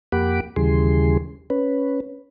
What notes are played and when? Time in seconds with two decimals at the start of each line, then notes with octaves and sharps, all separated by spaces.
0.12 F2 A#3 G4 F#5 B5 D6
0.56 D#2 C#3 E3 G3 G#4 C6
1.50 C#4 B4